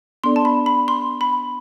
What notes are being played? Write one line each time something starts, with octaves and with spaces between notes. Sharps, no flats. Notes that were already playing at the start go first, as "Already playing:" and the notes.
B3 D4 A4 D5 C6
A5
B5
B5
C6
B5